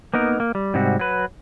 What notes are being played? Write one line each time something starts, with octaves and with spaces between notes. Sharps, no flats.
A#3 B3 D#4 A#4
A#3
G3
G#2 C3 G3 C4 F#4
F#3 B4